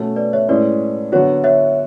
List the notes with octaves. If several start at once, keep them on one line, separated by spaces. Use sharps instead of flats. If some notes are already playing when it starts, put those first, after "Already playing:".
Already playing: B2 A3 C#4
B4 D5
C#5 E5
A2 G#3 C#4 G#4 B4 D5
D3 F#3 B3 F#4 C#5
C#5 E5